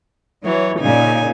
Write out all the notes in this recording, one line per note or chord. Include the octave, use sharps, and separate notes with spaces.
E3 F#3 C#5
A#2 C#3 D#4 G#5